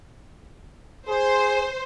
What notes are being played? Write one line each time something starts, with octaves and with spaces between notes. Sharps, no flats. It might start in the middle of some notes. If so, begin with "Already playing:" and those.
G#4 C5